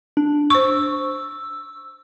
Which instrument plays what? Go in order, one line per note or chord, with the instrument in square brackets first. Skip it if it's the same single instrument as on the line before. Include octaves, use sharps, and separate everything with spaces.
[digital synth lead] D4
[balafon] C5 C#6 [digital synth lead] E6